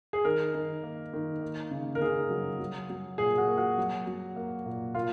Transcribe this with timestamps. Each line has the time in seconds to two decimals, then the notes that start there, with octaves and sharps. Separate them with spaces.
0.13 G#4
0.25 D#3 A#4
0.55 D#3
0.83 A#3
1.13 D#3
1.42 A#3
1.71 C#3
1.95 A#4
2.01 C#3 G#4
2.30 F#3
2.60 F#3
2.90 F#3
3.18 A#2 G#4
3.38 F#4
3.47 A#3
3.58 F#4
3.78 F#3
4.07 F#3
4.36 A#3
4.66 A#2
4.95 A#2 F4